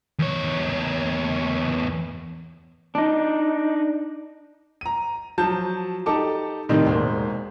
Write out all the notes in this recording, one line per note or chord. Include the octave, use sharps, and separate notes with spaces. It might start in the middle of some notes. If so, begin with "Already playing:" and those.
E2 C#5
D4 D#4
A#5 D#7
F3 F#3 A5 G6
D#4 G4 A4 A5 D6
A2 C3 D#3 G3 C4 D#4
E1 G#3 A#3 C5